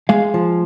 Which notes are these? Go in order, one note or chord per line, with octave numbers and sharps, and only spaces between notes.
G#3 F5
F3